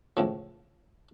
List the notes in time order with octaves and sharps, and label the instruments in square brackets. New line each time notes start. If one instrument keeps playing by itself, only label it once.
[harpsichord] C#2 A2 F3